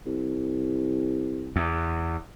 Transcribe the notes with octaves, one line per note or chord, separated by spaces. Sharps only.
C2
E2